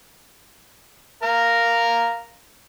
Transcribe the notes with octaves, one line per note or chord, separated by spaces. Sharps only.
A#4 F5 A#5